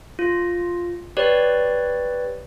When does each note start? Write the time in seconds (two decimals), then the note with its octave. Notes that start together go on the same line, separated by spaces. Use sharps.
0.19 F4
1.17 G4 B4 C#5 D5